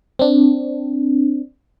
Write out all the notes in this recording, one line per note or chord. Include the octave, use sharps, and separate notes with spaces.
C4 D4